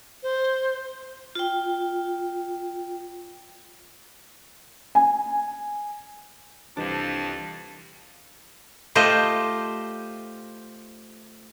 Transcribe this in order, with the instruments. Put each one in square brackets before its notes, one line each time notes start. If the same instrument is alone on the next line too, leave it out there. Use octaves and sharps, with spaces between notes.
[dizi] C5
[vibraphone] F4 G5
[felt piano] G#5
[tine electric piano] C2 E3 G4 [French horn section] F2 [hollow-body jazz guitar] D4 [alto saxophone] A5
[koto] A3 F4 G4 C5 D#5